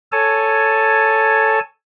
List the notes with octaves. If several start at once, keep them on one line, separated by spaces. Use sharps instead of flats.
A4 C#5 G#5 A5